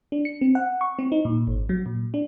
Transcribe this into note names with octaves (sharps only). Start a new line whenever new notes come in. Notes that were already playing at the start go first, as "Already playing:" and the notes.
D4
C#7
C4
F#5
C#6
C4
D#4
A#2
G#1
F#3
A#2
D4